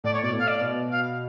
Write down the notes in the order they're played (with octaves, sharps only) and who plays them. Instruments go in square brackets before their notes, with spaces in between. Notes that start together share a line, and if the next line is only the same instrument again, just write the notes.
[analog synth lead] A2 [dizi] D5
[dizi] C#5
[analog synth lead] B2 [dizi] D5
[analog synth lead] A2
[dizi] F5
D5
[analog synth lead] B2
[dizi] F5